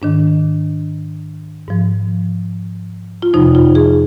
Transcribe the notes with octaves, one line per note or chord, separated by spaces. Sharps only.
G#2 D#3 D4
G#2 F3
F4
F2 C3 F3 D#4
F4
G#4